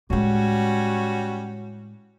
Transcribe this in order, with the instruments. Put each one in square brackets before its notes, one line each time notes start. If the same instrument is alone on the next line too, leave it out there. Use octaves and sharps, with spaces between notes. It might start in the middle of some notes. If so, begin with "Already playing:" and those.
[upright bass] A2 G#3 [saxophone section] G3 C#4 F#4